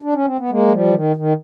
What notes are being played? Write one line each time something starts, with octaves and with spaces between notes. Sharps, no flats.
D4
C#4
C4
B3
G#3 A#3
F#3
F3 G3
E3
D#3
D#3